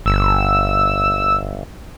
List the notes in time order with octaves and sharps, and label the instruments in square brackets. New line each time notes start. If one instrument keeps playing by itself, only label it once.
[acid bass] G1 [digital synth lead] E6